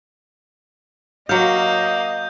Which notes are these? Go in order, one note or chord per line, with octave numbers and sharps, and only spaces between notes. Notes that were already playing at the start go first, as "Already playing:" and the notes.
F#3 A#3 D#5 F5 G6